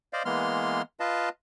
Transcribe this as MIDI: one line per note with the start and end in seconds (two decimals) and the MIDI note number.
0.13 0.23 72
0.13 0.23 74
0.13 0.23 75
0.13 0.23 77
0.25 0.82 52
0.25 0.82 56
0.25 0.82 58
0.25 0.82 59
0.25 0.82 84
0.25 0.82 89
1.00 1.29 65
1.00 1.29 71
1.00 1.29 75
1.00 1.29 77
1.00 1.29 81